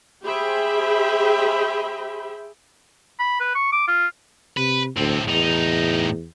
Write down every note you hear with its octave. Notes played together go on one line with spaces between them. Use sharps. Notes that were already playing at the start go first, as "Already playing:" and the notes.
G4 G#4 C5 E5 G5 B5
B5
B4
C#6
D6
F4
C3 B4
D2 A2 C4
E2 A2 D#4